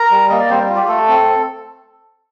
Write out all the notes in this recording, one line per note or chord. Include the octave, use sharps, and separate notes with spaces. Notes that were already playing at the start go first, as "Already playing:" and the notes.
Already playing: A#4 A#5
G3
A#3 D#5
D5
G3 C4 C5
F4
G4
A3 A4
C4